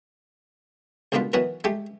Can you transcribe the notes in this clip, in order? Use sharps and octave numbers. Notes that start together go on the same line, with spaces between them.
C#2 B2 D3 A#3 F4 B4
D#3 E3 F#3 B3 F#4 B4
G#3 A3 G4